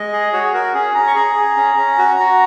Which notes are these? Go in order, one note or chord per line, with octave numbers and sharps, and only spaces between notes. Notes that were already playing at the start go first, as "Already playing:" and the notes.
Already playing: G#3 D#5
G#4
F#4 C#5
G#4
F#4 A#4
C#4 G#4
C#4 A#5
C#6
G#4 A#5
G#4
C#4
C#4
F#4
F#4